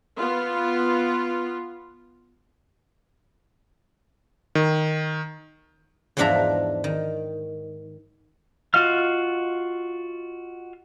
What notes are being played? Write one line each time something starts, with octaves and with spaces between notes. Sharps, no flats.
B3 F4
D#3
E2 G#2 F3 D4 E5 A#5
D#3
F4 F#4 D#5 F5 F6